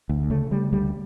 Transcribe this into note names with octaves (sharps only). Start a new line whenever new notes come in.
D2
C#3 A3
C#3 G3
D2 G3